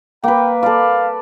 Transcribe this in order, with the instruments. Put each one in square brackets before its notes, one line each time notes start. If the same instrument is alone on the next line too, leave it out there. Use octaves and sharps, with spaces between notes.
[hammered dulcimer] A#3 B4 [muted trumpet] G5
[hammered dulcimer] A4 D5 [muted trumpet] F5